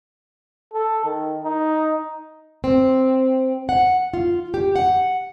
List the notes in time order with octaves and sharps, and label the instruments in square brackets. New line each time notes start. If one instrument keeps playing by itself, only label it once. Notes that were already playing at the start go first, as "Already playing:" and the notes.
[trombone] A4
D#3
D#4
[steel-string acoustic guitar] C4
F#5
F4
G4
F#5